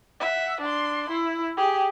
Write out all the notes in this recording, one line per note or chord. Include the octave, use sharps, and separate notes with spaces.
E5 F#5
D4 C6
E4
G4 G#4